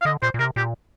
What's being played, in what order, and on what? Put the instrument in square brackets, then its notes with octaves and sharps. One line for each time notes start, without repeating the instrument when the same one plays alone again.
[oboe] F5
[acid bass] D3 [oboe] D#5
[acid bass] A#2 [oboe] C5
[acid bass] A#2
[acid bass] C3 [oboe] A#4
[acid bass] A#2 [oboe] G4